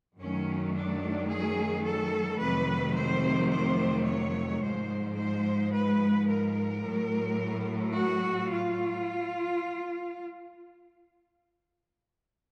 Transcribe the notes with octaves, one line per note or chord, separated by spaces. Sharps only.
F#2 D#3 F#3 A3 C#4
D4
G#4
A4
F2 C3 D#3 F#3 A3 B4
C5
C5
C#5
G#2 F3 G#3 C5
C5
B4
A#4
A2 F#3 A3
F#4
F4